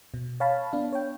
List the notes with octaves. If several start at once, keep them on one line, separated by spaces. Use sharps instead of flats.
B2
C#5 F5 A5 B5
B3 D4 F5
C#5 G5